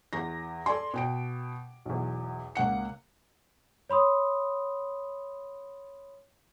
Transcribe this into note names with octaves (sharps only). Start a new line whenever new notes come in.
E2 A#5 A#6
A4 D5 G#5 C6
B2 G5 D7
B1 E2
C#2 A#3 F#5 C#7
C#5 B5 C6 D#6